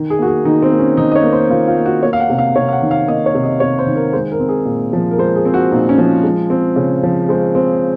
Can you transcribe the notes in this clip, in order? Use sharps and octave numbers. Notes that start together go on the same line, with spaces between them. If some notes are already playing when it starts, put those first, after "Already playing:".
Already playing: D#3
G#4
A#3 F#4
G#4
D#3 D#4
C4
A#3
C#4
D#3 D#4
D#5
C#5
A#3
C5
D#3 F4
F4
A#3
F#4
A#3 C#5
F5
F#5
C3
F5
C3 C#5
F5
F#5
D#3
F5
A#3 D#5
C#5
C3
D#5
C3 C#5
C5
D#3
A#4
G#3 C5
A#4
C4
G#4
A#2
F3
A#4
G#3 C5
G#4
C4
F#4
A#2 D#4
C#4
F3
G#3
C4
C#3
F3
G#3 C5
C4